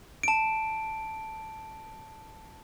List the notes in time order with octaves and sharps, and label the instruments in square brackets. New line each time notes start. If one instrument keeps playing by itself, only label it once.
[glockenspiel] A5 D7